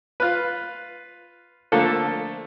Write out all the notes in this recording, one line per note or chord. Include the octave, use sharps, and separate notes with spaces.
F4 B4
D3 F3 A3 A#3 A4